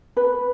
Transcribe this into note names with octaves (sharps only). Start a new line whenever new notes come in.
B4